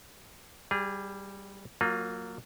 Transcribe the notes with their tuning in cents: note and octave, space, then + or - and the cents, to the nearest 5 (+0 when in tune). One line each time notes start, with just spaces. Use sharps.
G3 +0 G#4 -25
F#3 +0 A#3 -15 F4 +25